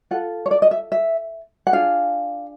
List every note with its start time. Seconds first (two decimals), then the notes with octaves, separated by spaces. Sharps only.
0.11 F4 A4 F#5
0.46 C#5
0.51 D5
0.62 D#5
0.71 E5
0.92 E5
1.67 F#5
1.73 D4 F4 G#4 F5